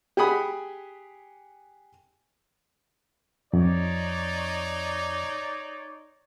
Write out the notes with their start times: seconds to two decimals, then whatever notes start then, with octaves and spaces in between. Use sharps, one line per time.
0.17 G4 G#4 F#5 G#5 B5 D#6
3.53 F2 D#4 C#5 D5